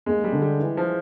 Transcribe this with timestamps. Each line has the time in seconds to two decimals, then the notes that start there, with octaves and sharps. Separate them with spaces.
0.06 D#2 G#3
0.24 G3
0.33 D3
0.41 G3
0.60 E3
0.77 F3